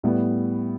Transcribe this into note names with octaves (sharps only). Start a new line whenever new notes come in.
A2 G3 B3